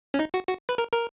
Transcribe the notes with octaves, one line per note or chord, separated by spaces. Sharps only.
C#4
D#4
F#4
F#4
B4
A#4
A#4